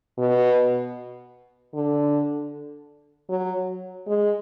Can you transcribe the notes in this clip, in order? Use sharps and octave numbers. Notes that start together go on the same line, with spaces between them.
B2
D3
F#3
G#3